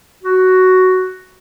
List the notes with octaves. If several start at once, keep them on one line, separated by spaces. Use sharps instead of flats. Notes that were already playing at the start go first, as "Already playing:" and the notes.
F#4